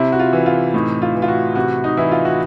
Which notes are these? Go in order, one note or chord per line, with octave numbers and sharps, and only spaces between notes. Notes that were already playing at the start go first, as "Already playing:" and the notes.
Already playing: C3 E4
F#4
F4
E3
F4
A2 D#4
F4
E3
F4
F#4
C3 F#4
D#4
E3 E4
F4
F#4